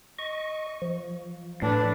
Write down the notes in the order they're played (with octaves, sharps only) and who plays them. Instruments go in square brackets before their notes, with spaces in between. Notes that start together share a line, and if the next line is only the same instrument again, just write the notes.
[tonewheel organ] D#5 C#6
F3
[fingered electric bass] A2 [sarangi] D4 [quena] B4